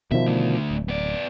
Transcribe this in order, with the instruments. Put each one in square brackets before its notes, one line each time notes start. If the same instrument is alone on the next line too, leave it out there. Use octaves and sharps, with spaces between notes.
[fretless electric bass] B2 D#3 F3 [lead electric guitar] E5
[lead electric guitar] D3 A3
[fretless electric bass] D1
[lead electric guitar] B3 D5